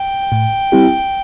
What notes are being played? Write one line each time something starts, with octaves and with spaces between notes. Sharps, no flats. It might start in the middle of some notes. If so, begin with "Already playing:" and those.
Already playing: G5
A2
G3 C4 E4 G4